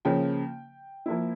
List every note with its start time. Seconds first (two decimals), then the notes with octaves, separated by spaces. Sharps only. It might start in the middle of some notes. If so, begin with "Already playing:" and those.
0.05 C#3 F3 A#3 C#4 G5
1.06 F3 A#3 E4